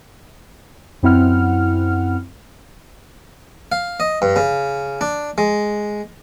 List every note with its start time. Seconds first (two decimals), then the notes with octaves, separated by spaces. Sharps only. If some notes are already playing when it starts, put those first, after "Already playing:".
1.03 F#2 C4 E4 F#5 F6
3.72 F5
4.00 D#5
4.22 G2
4.36 C#3
5.01 D4
5.38 G#3